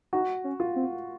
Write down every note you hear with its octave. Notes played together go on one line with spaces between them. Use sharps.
D#4 F#4
C#4
F4
C4